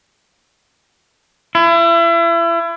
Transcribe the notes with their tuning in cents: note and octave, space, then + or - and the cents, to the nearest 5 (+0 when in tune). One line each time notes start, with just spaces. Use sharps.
E4 +35